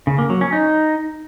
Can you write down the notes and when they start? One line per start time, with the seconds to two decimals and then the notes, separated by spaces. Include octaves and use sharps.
0.07 C#3
0.18 A#3
0.30 F#3
0.41 C#4
0.53 D#4